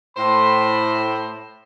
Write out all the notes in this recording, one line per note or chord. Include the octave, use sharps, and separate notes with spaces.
A2 C5 B5